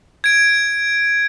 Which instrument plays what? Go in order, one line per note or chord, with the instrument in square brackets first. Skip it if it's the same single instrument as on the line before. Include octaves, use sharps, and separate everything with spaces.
[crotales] G#6 D7